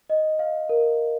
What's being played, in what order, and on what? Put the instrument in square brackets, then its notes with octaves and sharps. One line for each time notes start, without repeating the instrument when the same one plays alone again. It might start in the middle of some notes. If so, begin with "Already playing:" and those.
[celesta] D#5
F5
A#4